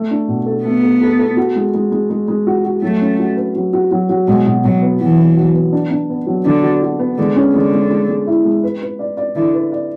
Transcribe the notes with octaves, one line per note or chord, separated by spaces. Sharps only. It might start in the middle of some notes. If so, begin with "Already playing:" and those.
Already playing: A3
D4
B2
A4
A3 B3
A4
A4
A4
F#4
G#3
G#3
G#3
G#3
G#3
F#4
F#4
F#3 A3
C#4
F#4
B4
F#3
F#4
F#3
F#3
B2 G#3
B2
B2 F#3
B3
E3 F#3
B3
F#3
B3
D4
D4
B3
F#3
D3 D4
F#4
F#4
B3
D3 G#3
C#4
D3 G#3
G#3
G#3
G#3
E4
G#3
B4
B4
D5
D5
D3 E4
B4
D5